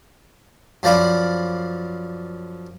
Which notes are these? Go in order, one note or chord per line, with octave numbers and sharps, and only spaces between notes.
F#2 F3 C5 D5 F5 B5